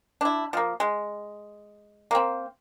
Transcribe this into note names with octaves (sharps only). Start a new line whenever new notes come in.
D4 E4
F3 A#3
G#3
A#3 C4